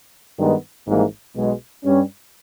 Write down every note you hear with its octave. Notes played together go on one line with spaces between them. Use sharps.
G2 D#3 G#3 B3 D#4
G#1 G#2 E3 G3 A#3
B1 B2 G#3
G2 G3 C#4